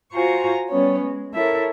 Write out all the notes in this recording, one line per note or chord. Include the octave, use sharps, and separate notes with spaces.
F4 F#4 C5 G#5 A#5 C#6
G3 B3 C#4 C#5
G#3
E4 A4 A#4 C#5 E5